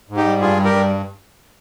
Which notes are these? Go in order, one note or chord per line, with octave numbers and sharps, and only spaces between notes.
G#2
D#4 G4
G3
G2 F4 G#4
G3
G4 A#4
G2